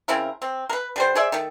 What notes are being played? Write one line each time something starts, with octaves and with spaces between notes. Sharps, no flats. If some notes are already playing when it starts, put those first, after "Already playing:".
C#3 C4 E4 A#4
C4
A#4 B4
D3 G3 C5
G#4 C5 D5 E5
D#3 A3